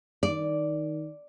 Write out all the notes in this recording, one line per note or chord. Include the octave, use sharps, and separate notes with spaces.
D#3 D5